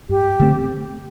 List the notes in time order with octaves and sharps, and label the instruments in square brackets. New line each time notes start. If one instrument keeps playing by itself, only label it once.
[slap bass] G2 [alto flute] G4
[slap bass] D3 A3 C4